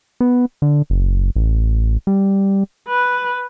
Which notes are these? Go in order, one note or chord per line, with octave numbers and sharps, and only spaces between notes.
B3
D3
F#1
A1
G3
B4